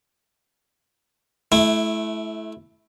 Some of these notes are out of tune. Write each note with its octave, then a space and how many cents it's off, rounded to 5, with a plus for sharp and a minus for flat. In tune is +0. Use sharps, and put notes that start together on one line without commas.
A3 -30 E4 +0